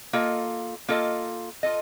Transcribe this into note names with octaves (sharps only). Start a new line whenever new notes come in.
A#3 F4 A4 D#5
A#3 F4 A4 D#5
F4 A4 D#5